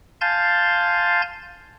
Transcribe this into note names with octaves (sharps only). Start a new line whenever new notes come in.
F5 G#5 A5 C6 G6 A6